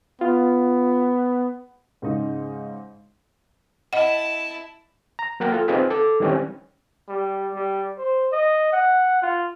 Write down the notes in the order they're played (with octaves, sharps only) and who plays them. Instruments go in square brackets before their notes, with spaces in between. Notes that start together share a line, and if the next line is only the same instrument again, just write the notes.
[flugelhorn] B3 [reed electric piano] F4
[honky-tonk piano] G#2 C#3 D#4
[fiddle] E4 A5 [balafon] D#5 F#5
[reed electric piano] A#5
F#3 A#3 A#4 F#5 G5
F4 A4
C4 D#4 F4 G#4 B4
A4 D6
D#3 E3 G3 C4 C#4
[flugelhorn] G3
G3
C5
D#5
F#5
F4